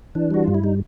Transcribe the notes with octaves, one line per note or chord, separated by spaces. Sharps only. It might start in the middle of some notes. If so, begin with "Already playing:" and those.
E3 D4
G3 F#4
G2 F4
E4
G3 D#4